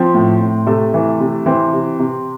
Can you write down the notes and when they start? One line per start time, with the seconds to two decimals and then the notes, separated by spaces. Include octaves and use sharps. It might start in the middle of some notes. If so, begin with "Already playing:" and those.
Already playing: F3 C4
0.14 A2
0.41 A2
0.67 C3 A3 A4
0.94 E3
1.20 C3
1.46 E3 C4
1.73 C3
1.99 C3